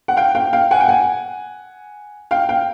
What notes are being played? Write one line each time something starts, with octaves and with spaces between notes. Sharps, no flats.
F#5
F5 G5
F5 G5
F5 G5
F#5 G#5
G5
F#5 G#5
F5 G5
F5 G5